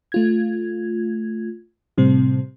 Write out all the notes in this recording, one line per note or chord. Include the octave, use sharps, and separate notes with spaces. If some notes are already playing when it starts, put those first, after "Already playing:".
A3 F4 G#6
A2 C3 G3 C4